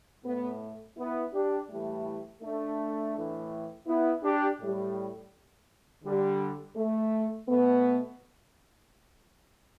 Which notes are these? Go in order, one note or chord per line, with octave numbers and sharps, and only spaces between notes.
A2 A3 B3
B3 E4
D4 G4
A2 E3 G3 A3
A3 D4
A2 E3 A3
B3 E4
D4 G4
A2 G3
D3 G3
A3
B2 A3 B3